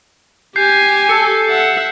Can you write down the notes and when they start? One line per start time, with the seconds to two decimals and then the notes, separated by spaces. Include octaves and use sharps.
0.56 G4 G#5 G6 C7
1.09 A4 C#7
1.50 E5 F#5